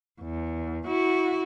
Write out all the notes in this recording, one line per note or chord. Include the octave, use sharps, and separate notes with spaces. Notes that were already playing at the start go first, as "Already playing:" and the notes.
E2
E4 F#4